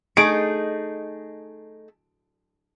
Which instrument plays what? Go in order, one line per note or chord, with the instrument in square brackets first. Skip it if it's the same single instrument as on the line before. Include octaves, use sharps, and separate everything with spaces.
[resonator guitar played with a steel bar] A3 D#4 G#4 [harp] D7